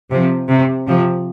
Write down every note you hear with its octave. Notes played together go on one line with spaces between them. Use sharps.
C3 F3
C3
C3 F3